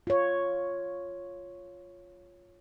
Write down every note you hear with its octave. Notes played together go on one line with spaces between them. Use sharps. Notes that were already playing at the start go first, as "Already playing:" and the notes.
F4 C#5